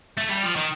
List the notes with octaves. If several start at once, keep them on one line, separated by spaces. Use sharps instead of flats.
A3
G3
F3
D#3